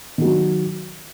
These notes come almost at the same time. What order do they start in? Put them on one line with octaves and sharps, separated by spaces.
D#3 F#4 F#3